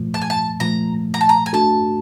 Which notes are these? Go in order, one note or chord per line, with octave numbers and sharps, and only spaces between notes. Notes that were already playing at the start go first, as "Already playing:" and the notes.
Already playing: A#2 F3 A3
A5
G#5
A5
A#2 F3 A3 A#5
A#5
A5
A#5
G#5
A3 D4 F#4 A4 A5